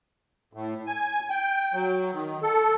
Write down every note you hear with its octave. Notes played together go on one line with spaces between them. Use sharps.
A2
G#5
G5
F#3
D#3
A4